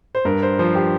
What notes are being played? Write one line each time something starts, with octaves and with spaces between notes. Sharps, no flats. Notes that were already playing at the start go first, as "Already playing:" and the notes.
C5
G2 A#4
C5
F3 C5
G4